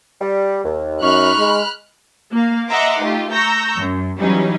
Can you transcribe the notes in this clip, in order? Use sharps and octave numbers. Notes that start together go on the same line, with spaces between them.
G3
D#2
F#2 D#4 B5 C#6 F6 F#6
G#3
A#3 F5
D#5 E5 F#5 A#5 C6 D6
A3 D#4 F4 G4
A#5 C#6 E6 G6 A#6
F#2
E3 F#3 G3 C#4 D#4